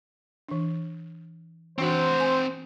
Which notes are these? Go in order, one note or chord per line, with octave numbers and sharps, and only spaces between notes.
E3 D4
E3 C4 D4 F#4 C5 F#5
G#5 C6